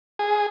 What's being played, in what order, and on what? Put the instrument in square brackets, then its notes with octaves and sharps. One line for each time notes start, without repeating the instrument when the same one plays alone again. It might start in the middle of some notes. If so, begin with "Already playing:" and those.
[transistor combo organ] G#4